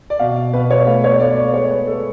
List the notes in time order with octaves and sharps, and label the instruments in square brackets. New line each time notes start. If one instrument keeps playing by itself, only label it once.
[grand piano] D5
B2 F5
B2 B4
C#5
A3 F5
C#5
A3 D5
D5
G#3 C#5
B4
G#3 A4